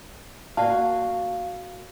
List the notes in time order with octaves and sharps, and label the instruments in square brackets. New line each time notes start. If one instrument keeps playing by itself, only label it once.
[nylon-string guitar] A#3 F#4 [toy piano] D5 F#5 A5 [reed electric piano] F5